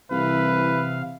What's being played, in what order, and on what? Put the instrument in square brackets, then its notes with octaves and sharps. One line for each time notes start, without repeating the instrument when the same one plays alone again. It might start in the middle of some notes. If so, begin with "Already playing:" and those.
[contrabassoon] C2 [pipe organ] C3 F5 [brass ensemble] E3 E5 [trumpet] B4